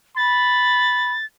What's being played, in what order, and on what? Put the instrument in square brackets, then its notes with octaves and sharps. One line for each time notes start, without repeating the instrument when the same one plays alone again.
[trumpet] B5 [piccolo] A6